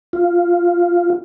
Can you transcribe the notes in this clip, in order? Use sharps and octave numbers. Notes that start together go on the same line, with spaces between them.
F4